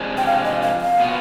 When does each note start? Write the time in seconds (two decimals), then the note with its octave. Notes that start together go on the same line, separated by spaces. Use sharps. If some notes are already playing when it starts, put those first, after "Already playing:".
Already playing: C3 F3 G#3 D4
0.18 G5
0.27 F5
0.45 D#5
0.63 F5
0.81 F5
1.00 B2 B3 F4